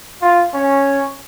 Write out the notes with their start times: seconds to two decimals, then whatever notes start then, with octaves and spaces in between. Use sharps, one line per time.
0.21 F4
0.54 C#4